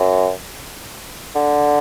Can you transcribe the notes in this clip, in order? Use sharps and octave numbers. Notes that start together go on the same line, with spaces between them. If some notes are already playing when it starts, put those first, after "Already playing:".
Already playing: F#2
D3